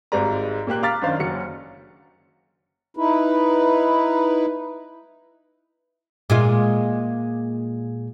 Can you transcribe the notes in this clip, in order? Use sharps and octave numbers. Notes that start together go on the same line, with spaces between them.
G#1 G#2 G3 G#3 D5 A#5
A#2 A#3 G4 F#6
F5 A#5 D6 F6 A6 B6
F#2 D#3 D4 C5 F5
F#1 F#3 F#4 C#7
D#4 E4 B4
A#2 G#3 F4